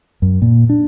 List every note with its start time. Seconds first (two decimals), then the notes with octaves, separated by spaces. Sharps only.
0.22 F#2
0.42 A#2
0.69 D4